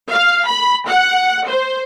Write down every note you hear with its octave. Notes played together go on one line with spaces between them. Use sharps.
F5
B5
F#5
C5